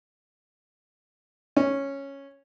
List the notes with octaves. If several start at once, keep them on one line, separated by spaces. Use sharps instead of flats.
C#4